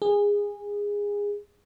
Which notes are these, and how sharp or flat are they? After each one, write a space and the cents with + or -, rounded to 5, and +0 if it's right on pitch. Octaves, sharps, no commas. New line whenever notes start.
G#4 -20